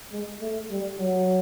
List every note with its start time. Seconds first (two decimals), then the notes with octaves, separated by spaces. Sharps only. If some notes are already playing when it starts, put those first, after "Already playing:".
0.12 G#3
0.41 A3
0.70 G3
0.98 F#3